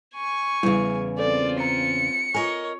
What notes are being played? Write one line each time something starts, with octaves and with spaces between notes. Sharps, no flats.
G#5 C#6
E2 C#3 G3 E4
C4 F4 A4 D5
A#5 C#7
F4 A#4 C#5 D#5 G#5